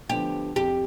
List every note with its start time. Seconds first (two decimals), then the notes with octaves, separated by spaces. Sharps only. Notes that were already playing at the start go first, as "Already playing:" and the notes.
0.10 D3 F3 B3 D4 G4
0.56 F2 G4